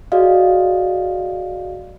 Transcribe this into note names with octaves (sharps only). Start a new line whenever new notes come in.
F#4 G#4 D5 D#5 F5